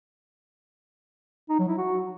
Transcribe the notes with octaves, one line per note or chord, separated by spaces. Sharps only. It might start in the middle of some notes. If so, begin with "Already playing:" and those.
D#4
F#3
E4
F#4